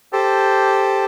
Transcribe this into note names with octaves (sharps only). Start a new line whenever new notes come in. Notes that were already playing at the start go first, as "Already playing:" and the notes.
G4 A4 C5 A5